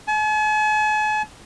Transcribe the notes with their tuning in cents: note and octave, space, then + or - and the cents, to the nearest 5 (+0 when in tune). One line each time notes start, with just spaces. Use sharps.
G#5 +45